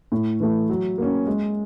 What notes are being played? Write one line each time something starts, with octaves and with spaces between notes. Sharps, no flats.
A2
E3 A3
F#3
A#3 C#4
G#3